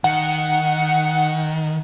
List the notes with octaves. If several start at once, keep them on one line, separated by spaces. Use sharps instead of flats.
D#3 F#5